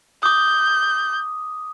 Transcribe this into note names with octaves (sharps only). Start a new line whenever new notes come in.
D6 D#6 G6